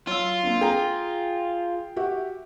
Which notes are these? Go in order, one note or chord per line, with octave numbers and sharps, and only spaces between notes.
F#3 F4 C6 E6
A#3 C4 D4
G#4 G5 A#5
F#4 G4 E5